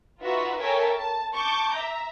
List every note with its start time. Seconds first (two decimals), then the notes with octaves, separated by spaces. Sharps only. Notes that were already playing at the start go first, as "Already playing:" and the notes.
0.20 D#4 F4 F#4 B4 E5
0.60 A4 A#4 C#5 E5 G5 G#5
0.97 A5
1.35 A5 C#6 D6 G6
1.75 E5 A#5